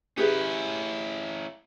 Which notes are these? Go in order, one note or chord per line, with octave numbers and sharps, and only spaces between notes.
C#4 E4 G4 G#4 B4